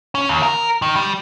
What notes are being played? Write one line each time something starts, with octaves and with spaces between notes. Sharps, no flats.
C#4
D#2
A#4
D#3
G3